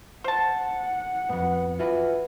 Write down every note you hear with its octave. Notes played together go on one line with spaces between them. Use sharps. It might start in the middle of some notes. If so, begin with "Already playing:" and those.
C5 F#5 A5
F2 G#2 B3
E3 F4 F#4 B4